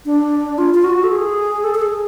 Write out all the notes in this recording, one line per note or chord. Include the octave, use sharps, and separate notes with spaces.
D4
F4
F4
F#4
A4
G#4
A4
A4
G#4